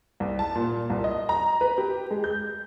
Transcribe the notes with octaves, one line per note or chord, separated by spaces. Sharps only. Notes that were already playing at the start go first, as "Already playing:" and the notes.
C2
A5
A#2
C2
D#5
A#5
B4
G4
G#3
G6